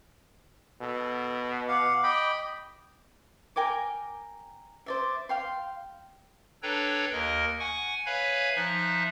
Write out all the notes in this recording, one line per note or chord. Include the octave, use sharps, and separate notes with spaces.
B2 A4
F5 F#5 D6
D#5 G5 B5
A#4 G5 G#5 D6
C5 D5 E5
F5 G5 C6
D4 A4 B4 C#5 G5 A#5
D#2 A#4 D#5
F#5 G#5 C#6
B4 C#5 E5 F5 G#5 B5
F3 D#4 E5 F#6